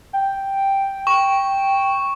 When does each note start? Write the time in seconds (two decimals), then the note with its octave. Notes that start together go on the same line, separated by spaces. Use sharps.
0.13 G5
1.07 C#6